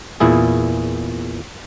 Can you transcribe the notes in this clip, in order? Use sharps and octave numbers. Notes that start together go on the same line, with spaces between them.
E2 A#2 E4 G#4